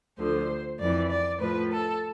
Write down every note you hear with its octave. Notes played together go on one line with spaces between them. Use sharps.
D2 D3 F3 C5
F2 E3 D5
D5
A2 F3 B4
A4